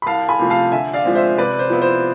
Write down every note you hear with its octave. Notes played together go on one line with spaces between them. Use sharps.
B5
C2 F5 A5
G#5 B5
C3 F3 A3
F5 A5
D3 E5 G#5
D5 F5
F3 G#3 C4
C5 E5
C3 B4 D5
C5
F3 B3 E4
C5